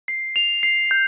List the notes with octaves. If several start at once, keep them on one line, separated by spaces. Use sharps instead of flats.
C7
F7
C7
G6